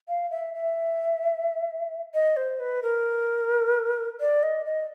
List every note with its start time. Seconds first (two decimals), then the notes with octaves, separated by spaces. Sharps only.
0.09 F5
0.31 E5
0.54 E5
2.14 D#5
2.37 C5
2.60 B4
2.83 A#4
4.20 D5
4.43 D#5
4.65 D#5